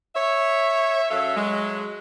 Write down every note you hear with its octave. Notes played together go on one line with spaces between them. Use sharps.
C#5 E5
F#2 F#3 A4 E5 F5
F#3 G#3